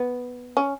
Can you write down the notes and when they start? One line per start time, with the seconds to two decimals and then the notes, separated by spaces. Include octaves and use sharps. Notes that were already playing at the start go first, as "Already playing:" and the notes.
Already playing: B3
0.57 C#4